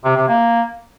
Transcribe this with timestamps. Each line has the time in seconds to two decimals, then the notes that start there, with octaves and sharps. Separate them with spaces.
0.05 C3
0.17 C3
0.28 A#3